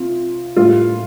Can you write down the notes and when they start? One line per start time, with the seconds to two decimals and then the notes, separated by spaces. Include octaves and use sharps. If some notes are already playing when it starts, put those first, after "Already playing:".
Already playing: C3 F4
0.56 A2 G3 F4